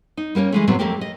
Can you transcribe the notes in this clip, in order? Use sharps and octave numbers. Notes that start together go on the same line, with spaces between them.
D#4
G3 A#3 B3 C#4
E3 G#3 A3
A2 C3 F#3 G3 B3 C4
F2 A3 A#3 G4
D#5